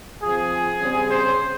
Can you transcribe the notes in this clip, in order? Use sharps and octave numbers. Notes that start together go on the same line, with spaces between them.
F3 C4 G#4
C#3 G3 C4
C5